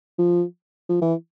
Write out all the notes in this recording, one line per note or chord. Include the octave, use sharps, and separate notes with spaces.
F3
F3
E3